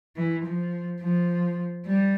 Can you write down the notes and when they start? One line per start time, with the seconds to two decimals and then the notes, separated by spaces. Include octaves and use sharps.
0.16 E3
0.45 F3
1.01 F3
1.86 G3